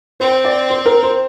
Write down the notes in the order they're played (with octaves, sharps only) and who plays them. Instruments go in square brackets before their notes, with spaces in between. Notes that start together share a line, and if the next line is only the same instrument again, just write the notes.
[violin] C4 [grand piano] C5
[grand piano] D5
C5
A#4
C5